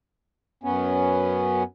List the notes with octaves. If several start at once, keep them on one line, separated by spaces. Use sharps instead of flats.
F#2 B3 C#4